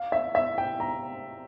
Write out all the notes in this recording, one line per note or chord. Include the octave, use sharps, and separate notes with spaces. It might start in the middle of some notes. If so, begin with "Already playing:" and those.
Already playing: F5
E5
E5
G5
A#5